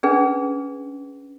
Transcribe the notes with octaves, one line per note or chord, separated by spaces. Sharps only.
C#4 D4 G#4 B4